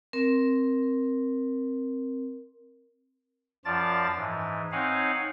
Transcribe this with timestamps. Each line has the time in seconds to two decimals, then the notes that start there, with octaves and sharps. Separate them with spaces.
0.13 C4 A#4
3.65 F#2 F3 F4 D5 A5 A6
4.16 G#2 E3
4.72 C4 D#4 C#5 F5 F#5 G#5